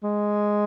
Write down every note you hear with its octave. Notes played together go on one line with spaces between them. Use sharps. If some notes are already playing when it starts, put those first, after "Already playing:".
G#3